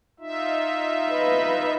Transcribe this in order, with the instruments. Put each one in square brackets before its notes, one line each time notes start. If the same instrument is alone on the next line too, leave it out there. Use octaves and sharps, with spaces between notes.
[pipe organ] D#4 F4 E5
[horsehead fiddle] B4 D#5